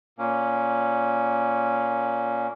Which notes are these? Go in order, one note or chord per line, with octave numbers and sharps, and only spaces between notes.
A#2 A#3 C#4